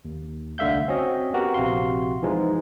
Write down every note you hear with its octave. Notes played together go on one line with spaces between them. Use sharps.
D#2
C2 D3 A3 E5 F5 G6
C4 C#4 F#4 D#5
B3 F#4 G4 A#4
A#1 C3 F#4 F5 C6
E3 F3 G#3 D#4